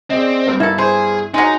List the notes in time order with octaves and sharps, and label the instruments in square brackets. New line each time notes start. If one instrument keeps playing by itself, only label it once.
[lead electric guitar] C4 [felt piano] G#4 D5 D#5
[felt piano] G2 B3
[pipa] A#3 A4 [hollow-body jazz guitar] E4
[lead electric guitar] G#4 [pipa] C5
[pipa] F#3 G#3 [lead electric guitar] D#4